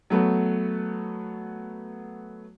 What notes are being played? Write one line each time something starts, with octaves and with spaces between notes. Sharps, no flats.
F#3 A3 B3 F#4